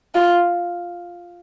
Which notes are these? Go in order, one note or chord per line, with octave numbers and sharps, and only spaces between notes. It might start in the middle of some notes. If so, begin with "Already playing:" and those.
F4